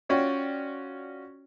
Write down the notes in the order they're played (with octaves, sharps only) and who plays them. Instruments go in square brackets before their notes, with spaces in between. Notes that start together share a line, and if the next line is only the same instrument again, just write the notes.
[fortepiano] C#4 F4 F#4 C#5 D5 G5